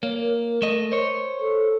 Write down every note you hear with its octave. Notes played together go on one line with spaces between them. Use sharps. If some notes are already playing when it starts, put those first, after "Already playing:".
A#3 C#5
A#4
A3 D#5
C5 C#5
A4